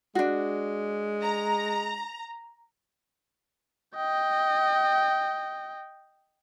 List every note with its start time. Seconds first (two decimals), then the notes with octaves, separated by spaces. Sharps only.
0.15 G#3 D4 F#4
1.22 A#5
3.97 D#5 G5